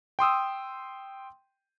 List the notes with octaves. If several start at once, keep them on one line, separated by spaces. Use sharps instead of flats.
G5 C6 D#6 E6